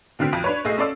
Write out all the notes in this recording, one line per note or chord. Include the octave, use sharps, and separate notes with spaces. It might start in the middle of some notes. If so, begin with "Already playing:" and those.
B2 D3 C4 F6 B6 D7
B1 F2
D4 B4 C#5
B1 A3 G#4 D#5 E6 C7
C#4 A4 D5 E6